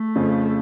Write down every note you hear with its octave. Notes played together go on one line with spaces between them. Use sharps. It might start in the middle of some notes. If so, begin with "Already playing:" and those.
Already playing: A3
F2 C#3 F3